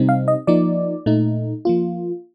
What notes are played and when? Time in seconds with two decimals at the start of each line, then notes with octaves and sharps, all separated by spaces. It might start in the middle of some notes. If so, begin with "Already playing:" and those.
Already playing: C3 G3 C4 D#4
0.09 F5
0.28 D#5
0.47 F3 A#3 D#4 D5
1.06 A#2 A3 D#4
1.65 F3 A#3 F4